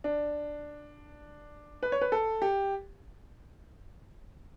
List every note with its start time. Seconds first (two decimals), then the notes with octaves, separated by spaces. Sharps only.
0.04 D4
1.83 B4
1.92 C#5
2.01 B4
2.12 A4
2.42 G4